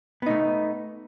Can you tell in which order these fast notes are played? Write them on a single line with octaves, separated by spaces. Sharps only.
B3 D#4 A3